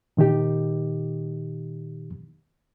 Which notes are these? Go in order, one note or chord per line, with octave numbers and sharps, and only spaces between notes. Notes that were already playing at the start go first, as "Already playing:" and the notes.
A#2 D#3 D#4 G4